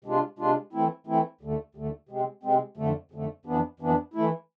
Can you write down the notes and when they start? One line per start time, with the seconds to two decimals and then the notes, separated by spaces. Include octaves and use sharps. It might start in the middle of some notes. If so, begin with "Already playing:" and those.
0.04 C3 G#3 D4 F4
0.39 C3 G#3 D4 F4
0.73 E3 A3 C4 E4
1.07 E3 A3 C4 E4
1.41 D2 D3 A3
1.75 D2 D3 A3
2.09 C3 G#3 C4
2.43 C3 G#3 C4
2.77 F2 D3 A3
3.11 F2 D3 A3
3.45 F2 E3 B3 D4
3.80 F2 E3 B3 D4
4.14 E3 A3 E4